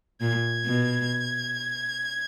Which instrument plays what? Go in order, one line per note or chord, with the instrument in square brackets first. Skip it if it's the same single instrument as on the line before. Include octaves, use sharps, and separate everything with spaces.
[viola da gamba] A#2 [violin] G#6
[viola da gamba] B2